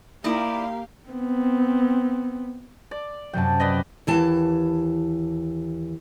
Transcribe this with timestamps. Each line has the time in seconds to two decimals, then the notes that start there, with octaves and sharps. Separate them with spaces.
0.24 A#3 D#4 E4 G4 D5 F5
1.09 B3 C4
2.91 D5
3.33 F#2 C3 F#3 G5 A5
3.60 B4 D5 D#5
4.07 D#2 E3 A5